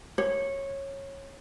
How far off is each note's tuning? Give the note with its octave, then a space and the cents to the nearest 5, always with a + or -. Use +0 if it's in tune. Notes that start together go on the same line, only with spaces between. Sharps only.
C#5 -15